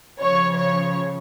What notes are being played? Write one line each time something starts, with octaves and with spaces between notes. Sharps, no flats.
C#3 F3 C#5
C#5